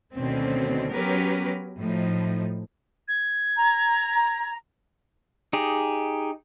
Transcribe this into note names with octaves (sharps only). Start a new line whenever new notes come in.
D2 B2 D3 D#3 C4 C#4
F#3 B3 C#4 G4 A#4 B4
A2 F3 D#4
G#6
A#5
D#4 G4 G#4